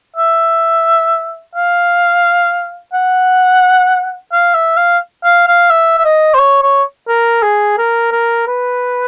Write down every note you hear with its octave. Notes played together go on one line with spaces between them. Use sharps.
E5
F5
F#5
F5
E5
F5
F5
F5
E5
E5
D#5
C5
C#5
C#5
A#4
G#4
A#4
A#4
B4